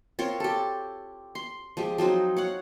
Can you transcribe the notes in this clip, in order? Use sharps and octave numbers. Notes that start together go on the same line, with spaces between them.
C4 F4 A#4 C#5
G4 A4
C6
F3 G#3 G4
F3 F#3 C4 D#4
C#5 F5 F#5